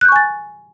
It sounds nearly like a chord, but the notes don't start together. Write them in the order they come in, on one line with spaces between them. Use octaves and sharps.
F#6 G6 C#6 G#5 A6